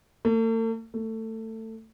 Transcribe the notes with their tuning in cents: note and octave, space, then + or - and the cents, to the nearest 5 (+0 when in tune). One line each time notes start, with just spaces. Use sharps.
A3 +45
A3 +20